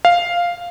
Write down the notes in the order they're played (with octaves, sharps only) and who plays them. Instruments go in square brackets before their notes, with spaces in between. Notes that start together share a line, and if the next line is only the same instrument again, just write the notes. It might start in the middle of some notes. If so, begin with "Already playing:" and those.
[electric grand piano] F5